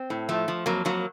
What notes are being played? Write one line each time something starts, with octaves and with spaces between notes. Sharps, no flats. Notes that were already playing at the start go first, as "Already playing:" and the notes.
Already playing: C4
A2
F3 A3
F3
F2 F#3 A#3
F2 F#3 A#3